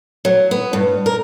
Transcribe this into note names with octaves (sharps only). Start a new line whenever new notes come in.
F#3
B3
G2
A#4